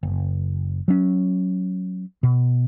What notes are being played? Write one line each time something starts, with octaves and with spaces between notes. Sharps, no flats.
F#1
F#3 C#4
B2